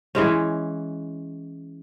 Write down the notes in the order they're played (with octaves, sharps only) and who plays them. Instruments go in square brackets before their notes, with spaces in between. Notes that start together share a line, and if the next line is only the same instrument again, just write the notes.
[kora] E3 G#3 C#4